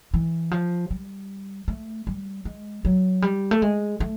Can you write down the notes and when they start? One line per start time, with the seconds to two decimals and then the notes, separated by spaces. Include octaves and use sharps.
0.14 E3
0.51 F3
0.91 G3
1.68 A3
2.07 G3
2.45 G#3
2.85 F#3
3.22 G3
3.51 A3
3.62 G#3
4.00 A3